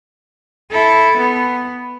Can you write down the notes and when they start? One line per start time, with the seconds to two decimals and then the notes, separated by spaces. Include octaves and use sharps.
0.71 E4 A4
1.18 B3